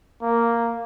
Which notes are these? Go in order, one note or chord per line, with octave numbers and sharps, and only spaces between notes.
A#3